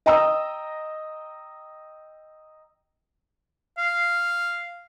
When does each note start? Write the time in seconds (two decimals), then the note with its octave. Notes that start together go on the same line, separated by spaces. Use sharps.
0.06 D#5 G5 A#5 D#6 E6
3.78 F5